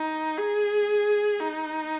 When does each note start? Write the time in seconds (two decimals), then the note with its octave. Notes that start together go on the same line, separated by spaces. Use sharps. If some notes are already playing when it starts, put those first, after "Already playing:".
Already playing: D#4
0.38 G#4
1.40 D#4